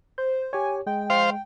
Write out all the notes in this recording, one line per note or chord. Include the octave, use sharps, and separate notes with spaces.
C5 G6
G4 C#5 G#5
G#3 G5
C5 F5